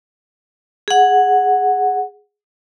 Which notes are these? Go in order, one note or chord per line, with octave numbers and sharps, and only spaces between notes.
G#4 F#5